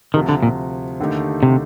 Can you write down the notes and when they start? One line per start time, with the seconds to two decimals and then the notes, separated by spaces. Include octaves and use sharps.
0.14 D2 C3 D#3 F3
0.29 D3
0.43 A#2
1.00 D#2 D3 A3 D#4 G4
1.43 C3